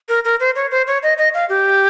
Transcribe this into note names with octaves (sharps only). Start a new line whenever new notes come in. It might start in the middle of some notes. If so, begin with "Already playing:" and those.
A#4
A#4
C5
C#5
C5
C#5
D#5
D#5
F5
G4